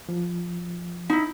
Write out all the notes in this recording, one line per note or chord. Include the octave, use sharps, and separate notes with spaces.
F3
D#4 E4